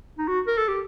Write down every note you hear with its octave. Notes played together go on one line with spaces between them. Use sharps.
D#4
F#4
A#4
A4
G4